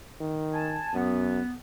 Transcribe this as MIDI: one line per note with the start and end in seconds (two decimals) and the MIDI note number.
0.21 0.81 51
0.53 0.93 80
0.53 0.93 81
0.94 1.42 42
0.94 1.52 59